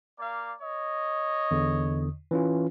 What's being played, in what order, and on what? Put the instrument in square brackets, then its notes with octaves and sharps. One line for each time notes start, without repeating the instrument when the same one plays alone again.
[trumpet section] A#3 D5 F5
C#5 D#5
[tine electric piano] E2 D3
E3 C#4 F4